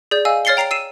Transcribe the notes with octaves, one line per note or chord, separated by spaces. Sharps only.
G#4 D5 G6
D#5 F5 G#5 E6
C#5 F6 A6 C7 C#7 G7
G5 A#5 C7 D7 F7
E6 C7 D#7 E7